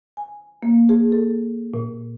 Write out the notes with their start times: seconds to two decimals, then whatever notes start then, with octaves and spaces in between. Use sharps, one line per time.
0.17 G#5
0.63 A#3
0.89 G#4
1.12 A4
1.74 A#2